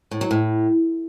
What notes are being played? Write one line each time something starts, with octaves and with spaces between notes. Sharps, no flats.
A2
F#3
A2